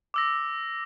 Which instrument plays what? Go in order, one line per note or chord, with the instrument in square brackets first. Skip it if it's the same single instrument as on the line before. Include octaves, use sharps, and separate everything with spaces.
[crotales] D6 E6 A#6